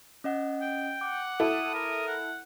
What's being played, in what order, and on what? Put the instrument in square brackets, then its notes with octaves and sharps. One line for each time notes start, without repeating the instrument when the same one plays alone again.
[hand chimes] C#4 D#5 F#5
[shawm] G5
[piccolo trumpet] F#5 [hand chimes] D6
[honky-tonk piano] E4 A4 [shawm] D#6
[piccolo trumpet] A#4
[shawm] F#5